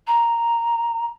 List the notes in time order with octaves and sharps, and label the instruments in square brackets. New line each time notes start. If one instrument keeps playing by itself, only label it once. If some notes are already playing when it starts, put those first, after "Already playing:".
[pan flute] A#5